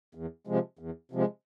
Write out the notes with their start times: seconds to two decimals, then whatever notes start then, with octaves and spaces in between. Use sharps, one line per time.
0.15 E2
0.47 C3 F3 G#3
0.79 E2
1.12 C3 F3 G#3